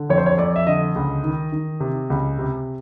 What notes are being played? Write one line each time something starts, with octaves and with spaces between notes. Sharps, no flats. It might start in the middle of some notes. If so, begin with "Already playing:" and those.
Already playing: D3
F2 C#5
C5
C#5
F2 D5
E5
D3 D#5
C#2
D#3
D#3
C3
C#2
C3